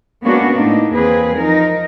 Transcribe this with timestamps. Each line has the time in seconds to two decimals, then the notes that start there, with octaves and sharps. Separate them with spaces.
0.23 G#3 A#3 B3 C#4 D4 F#4
0.52 A2 A#3 D4 D#4
0.93 E2 A#3 C4 G#4 B4
1.36 F3 D#4 A#4